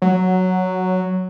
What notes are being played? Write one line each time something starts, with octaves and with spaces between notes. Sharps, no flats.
F#3